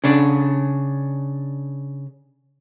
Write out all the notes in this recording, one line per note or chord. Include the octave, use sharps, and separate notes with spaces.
C#3 D4